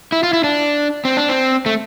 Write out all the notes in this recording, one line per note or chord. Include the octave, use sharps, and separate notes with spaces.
E4
F4
E4
D4
C4
D4
C4
A3